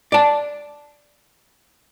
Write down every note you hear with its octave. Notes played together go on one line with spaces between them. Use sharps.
D5 A5